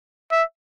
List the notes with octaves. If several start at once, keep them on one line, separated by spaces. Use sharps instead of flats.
E5